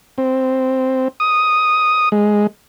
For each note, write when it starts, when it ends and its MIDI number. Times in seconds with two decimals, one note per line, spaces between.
0.18 1.08 60
1.20 2.09 87
2.12 2.47 56